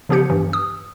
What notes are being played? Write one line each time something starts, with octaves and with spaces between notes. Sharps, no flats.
C#3 F3 B3 G4 G6 C#7
G2 E3
D#6